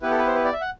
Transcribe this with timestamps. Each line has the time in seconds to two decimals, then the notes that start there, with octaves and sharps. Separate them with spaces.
0.02 B3 E4 G4 B4
0.11 A4
0.19 B4
0.27 C5
0.35 B4
0.45 D5
0.53 E5
0.61 F#5